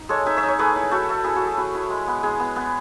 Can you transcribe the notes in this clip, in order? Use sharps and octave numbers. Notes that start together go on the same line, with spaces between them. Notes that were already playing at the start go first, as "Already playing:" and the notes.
Already playing: D#4
G#3 A4 C#5
D#4 E5 G#5
C#5 E5
D#4
C#5
A3 G#4 B4
E4
A3 F#4 A4
A3
E4 G#4 B4
F#4 A4
A3
G#4
E4 F#4
E4
G#3
B3
G#3 G#4
B3
B3